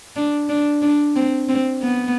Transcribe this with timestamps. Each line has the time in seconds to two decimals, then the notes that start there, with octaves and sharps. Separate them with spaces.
0.16 D4
0.49 D4
0.82 D4
1.16 C4
1.49 C4
1.82 B3